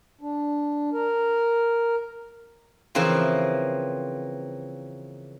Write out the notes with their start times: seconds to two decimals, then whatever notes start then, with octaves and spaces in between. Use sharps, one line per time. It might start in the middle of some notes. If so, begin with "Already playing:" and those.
0.21 D4
0.93 A#4
2.95 C#3 E3 F3 A#3 C4